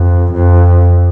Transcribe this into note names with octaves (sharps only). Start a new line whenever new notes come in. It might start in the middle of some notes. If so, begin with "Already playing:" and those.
Already playing: F2
F2